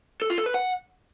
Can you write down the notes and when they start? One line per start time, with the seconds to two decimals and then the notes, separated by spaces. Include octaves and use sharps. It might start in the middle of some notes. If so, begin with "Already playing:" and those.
0.22 A4
0.30 F4
0.38 A4
0.46 B4
0.54 F#5